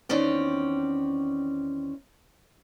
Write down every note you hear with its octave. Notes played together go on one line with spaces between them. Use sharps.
E2 D#3 C4 C#4 D5